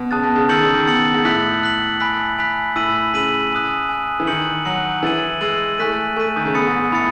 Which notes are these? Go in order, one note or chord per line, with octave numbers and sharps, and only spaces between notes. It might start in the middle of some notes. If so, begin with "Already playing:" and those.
Already playing: B2
C#3 A5 D#6 F#6 A6
B2
C#3
D#3 E6 A6 C#7 F#7
C#3
D#3
B2 E6 A6 C#7 F#7
G#2
A2 F#6 B6 F#7
F#6 B6 F#7
G#5 B5 F#6 B6
G#5 B5 F#6 B6
A2 E6 B6 D#7 F#7
C#3 E6 B6 D#7 F#7
G#5 D#6 F#6
G#5 D#6 F#6
E3
D#3 F#6 C#7 F#7
F#3 F#6 C#7 F#7
E3 E6 A6 D#7 F#7
G#3 E6 A6 D#7 F#7
A3 G#5 C#6 F#6 B6 D#7
A3 G#5 C#6 F#6 B6 D#7
D#3
C#3
B2 B5 D#6 A6 C#7
G#2
G#2
A2 B5 D#6 A6 C#7